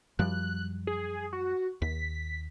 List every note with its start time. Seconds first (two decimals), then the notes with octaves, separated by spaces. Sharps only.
0.19 F#2 F3 G3 F#6
0.87 G#4
1.33 F#4
1.82 D#2 B6